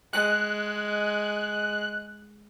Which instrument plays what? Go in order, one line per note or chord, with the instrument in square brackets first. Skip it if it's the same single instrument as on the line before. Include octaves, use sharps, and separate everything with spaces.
[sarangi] G#3 [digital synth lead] F#6